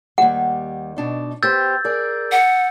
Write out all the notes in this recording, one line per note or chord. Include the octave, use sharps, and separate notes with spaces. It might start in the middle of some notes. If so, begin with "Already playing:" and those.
D#2 G3 F#5
B2 D4 D#4
B3 G4 C5 E6 G6 A6
G#4 A#4 D5
F#5